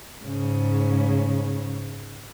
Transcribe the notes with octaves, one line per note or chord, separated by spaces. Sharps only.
G#2 C#3